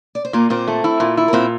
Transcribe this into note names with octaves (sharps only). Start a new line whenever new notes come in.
D5
C5
A#2 A#3 A#4
A#2 C4 C5
A3
E4
A#2
E4
A#4
A#2 C4 C5